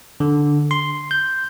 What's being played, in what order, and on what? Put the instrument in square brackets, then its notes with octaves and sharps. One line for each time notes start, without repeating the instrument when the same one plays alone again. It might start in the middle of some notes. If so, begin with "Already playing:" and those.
[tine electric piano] D3
C6
G6